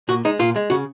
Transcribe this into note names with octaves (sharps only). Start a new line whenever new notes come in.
A#2 F#4
G#3 D#4
A#2 F4
G#3
C#3 F#4